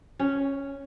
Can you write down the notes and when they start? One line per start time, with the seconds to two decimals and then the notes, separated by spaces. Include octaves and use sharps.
0.19 C#4